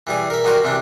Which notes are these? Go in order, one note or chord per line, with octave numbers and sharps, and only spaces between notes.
E3 G3 G#4
A#4 E5
D#3 G3 D#4 F#4 A#4 C5
C3 E3 D4